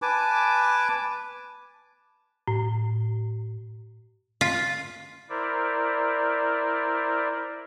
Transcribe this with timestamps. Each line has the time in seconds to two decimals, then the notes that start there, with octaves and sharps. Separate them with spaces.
0.02 B4 G#5 A5 D6
2.48 A2
4.41 F4
5.29 E4 A#4 C5 D5